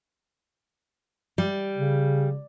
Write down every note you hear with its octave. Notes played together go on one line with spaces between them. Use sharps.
G3
C#3